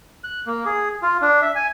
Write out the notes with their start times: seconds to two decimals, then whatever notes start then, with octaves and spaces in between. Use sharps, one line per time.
0.24 F#6
0.47 A#3
0.66 G#4
1.02 F4
1.22 D4
1.42 E5
1.55 G#5